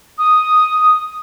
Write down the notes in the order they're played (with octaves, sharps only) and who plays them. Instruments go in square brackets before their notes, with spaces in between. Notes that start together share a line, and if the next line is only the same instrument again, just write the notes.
[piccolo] D#6